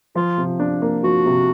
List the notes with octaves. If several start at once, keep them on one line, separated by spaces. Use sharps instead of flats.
F3 F4
C3
D4
A#3
F3 F#4
C3